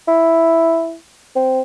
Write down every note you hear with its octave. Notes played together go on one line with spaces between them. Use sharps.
E4
C4